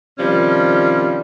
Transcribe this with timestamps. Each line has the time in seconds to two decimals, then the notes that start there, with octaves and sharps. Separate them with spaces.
0.19 C3 D#3 F3 G3 C#4